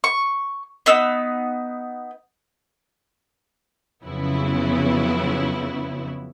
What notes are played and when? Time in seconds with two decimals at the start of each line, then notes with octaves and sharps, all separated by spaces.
0.04 C#6
0.86 B3 D#4 E6
4.04 F2 C#3 F#3 B3 E4